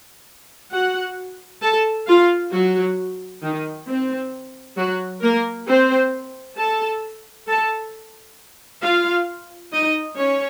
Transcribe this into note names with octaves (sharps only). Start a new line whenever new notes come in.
F#4 F#5
A4 A5
F4 F5
F#3 F#4
D#3 D#4
C4
F#3 F#4
A#3 A#4
C4 C5
A4 A5
A4 A5
F4 F5
D#4 D#5
C#4 C#5